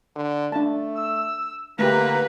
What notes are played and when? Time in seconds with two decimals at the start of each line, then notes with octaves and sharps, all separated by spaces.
0.16 D3
0.52 A3 D4 A5
0.95 E6
1.79 D3 A3 A#3 G4 B4 A#5